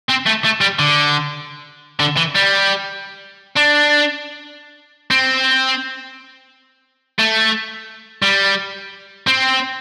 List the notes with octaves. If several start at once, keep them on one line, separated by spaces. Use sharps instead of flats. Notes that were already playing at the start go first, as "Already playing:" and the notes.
C4
A3
A3
G3
D3
D3
E3
G3
D4
C4
A3
G3
C4